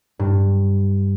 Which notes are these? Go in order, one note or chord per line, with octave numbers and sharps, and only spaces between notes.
G2